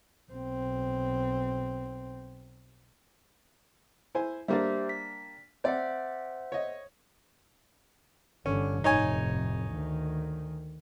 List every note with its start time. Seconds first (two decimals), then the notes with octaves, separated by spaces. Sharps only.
0.32 B1 C4
4.15 E4 C5 G#5
4.48 G3 A#3 D4 G4 C5 E5
4.89 B6
5.64 C4 C5 D5 E5 F#5
6.52 C#5 D#5
8.46 G1 D3 C#4
8.84 F1 A2 D#4 C#5 G#5
9.72 D2 D#3